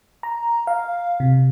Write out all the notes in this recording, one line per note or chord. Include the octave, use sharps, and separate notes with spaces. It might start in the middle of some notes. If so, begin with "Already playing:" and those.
A#5
F5
C3